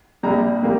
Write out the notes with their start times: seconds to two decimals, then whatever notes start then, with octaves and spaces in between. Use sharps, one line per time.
0.23 A#1 A#2 G3 A#5
0.63 A#2 G3 A#3